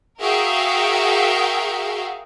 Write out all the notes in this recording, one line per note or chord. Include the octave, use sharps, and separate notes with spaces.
F#4 G#4 A#4 E5 F5 G5